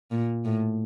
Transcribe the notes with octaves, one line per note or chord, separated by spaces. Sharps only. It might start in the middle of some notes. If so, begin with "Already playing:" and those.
A#2
A2